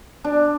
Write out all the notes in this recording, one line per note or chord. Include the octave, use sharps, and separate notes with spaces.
D4